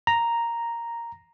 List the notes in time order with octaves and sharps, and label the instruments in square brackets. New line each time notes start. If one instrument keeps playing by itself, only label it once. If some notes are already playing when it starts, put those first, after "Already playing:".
[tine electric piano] A#5